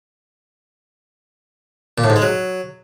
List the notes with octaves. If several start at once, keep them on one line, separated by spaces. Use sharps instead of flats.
A#2
A2
G#2
G#3
F#3